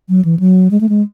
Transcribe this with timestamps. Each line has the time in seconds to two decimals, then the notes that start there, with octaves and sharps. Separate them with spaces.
0.09 F#3
0.25 E3
0.39 F#3
0.71 G#3
0.81 A3
0.89 G#3